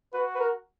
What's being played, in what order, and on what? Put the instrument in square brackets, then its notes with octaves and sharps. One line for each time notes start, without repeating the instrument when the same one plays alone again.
[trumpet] F#4 [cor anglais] B4
[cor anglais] B4
A#4